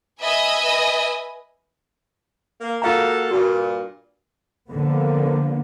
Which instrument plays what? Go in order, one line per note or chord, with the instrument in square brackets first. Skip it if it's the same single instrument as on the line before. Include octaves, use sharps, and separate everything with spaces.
[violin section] B4 D#5 E5 G#5 B5 D#6
[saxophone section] A#3
[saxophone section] A#3 F#4 A4 [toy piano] F4 F5 A#5
[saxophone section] G2 A#2 [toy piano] F#4
[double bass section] D3 F3 A#3 B3